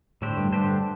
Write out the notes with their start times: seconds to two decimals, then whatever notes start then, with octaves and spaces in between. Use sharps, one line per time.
0.22 A2 D3 A3 D4 G4 C5
0.37 G2
0.52 G2 D3 A3 D4 G4 C5